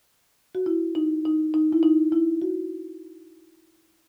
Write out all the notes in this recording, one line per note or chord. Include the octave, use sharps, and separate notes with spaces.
F#4
E4
D#4
D#4
D#4
E4
D#4
E4
F#4